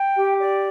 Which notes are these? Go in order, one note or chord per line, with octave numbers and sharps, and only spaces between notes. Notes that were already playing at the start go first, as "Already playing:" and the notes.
Already playing: G5
G4
D5